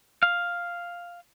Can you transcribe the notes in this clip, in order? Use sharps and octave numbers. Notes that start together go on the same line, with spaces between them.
F5